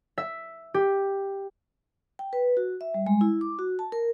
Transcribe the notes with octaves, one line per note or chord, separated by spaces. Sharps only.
E5
G4
G5
B4
F#4
E5
G3
G#3
E4
D6
F#4
A5
A#4